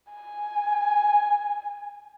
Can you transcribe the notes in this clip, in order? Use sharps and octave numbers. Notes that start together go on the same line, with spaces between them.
G#5